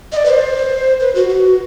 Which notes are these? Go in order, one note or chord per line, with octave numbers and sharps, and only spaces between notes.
D#5
D5
B4
C5
B4
F#4
F#4